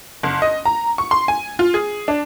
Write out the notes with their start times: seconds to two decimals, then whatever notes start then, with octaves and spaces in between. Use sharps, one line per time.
0.23 F#1
0.42 D#5
0.65 A#5
0.98 C#6
1.11 C6
1.28 G#5
1.59 F4
1.74 G#4
2.08 D4